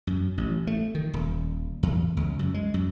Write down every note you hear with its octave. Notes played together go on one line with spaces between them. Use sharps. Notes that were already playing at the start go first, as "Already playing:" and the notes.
F#2
A1
A3
D#3
D#1
E2
C#2
F#2
G#3
F#2